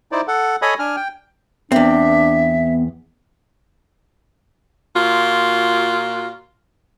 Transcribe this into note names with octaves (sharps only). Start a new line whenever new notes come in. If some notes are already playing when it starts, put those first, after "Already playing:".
D#4 E4 C5 D5
A4 F#5
A4 C#5 D#5 G#5 B5 D#6
D4 G#5 F6
G5
E2 B3 C4 D4 E5
A#2 F4 F#4